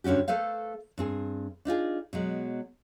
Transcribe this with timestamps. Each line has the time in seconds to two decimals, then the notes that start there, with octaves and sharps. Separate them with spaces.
0.04 G2 D3 C#4 F#4 G4
0.28 A3 A4 B4 C5 F5
0.98 G2 C4 G#4
1.65 D4 D#4 F4 G#4
2.13 B2 F#3 G#3